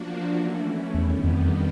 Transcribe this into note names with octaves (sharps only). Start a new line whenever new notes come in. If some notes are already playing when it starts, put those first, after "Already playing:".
Already playing: F3 A#3 D4 F#4
E3 A3 C#4 E4
E2 G2 D#3 G3 B3
F2